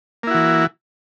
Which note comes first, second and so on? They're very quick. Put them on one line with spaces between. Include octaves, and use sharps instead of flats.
A#3 E4 F#4 E3